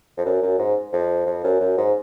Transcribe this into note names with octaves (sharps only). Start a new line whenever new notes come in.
F2
F#2
F#2
G#2
F2
F2
F#2
F#2
G#2